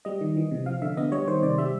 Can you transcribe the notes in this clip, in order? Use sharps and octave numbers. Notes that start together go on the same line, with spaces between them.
G3 D#5
D#3
E3
C3
F3 F5
D3 E5
B3 D#5
G3 C#5
D#3 C5
C3 D5
G3 E5